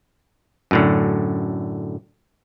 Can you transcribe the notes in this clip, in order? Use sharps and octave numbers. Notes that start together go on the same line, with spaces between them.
F#2 A2 D3